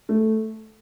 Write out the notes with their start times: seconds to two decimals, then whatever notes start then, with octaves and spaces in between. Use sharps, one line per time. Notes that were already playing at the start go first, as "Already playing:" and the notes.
0.09 A3